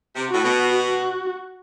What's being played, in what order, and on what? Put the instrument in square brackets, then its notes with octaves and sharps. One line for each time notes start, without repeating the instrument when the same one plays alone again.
[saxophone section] C3
[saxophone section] A2 [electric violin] F#4
[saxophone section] B2
[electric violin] F#4